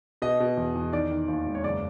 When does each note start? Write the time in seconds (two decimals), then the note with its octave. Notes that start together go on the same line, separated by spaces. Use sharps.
0.22 B2 D#5
0.40 B2
0.57 E2
0.75 E2
0.92 D#3 D5
1.11 D#3
1.28 D#2
1.46 E1
1.55 C#5
1.64 F#1 D5